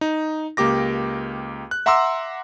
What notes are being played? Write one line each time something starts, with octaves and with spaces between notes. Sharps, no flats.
D#4
C#2 A#3 G4 D6 A#6
F#6
E5 F#5 A#5 C6 D6 E6